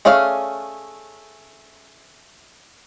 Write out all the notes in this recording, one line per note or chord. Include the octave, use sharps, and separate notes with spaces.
A3 C#4 G#4 D5 F5